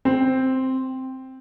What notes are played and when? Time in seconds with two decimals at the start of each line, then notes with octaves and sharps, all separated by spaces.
0.05 C4